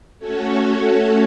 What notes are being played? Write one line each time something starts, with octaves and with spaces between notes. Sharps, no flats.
A3 C#4 F#4 A4 C#5